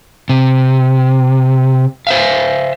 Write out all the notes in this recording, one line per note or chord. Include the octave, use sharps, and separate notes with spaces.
C3
C5 E5 F5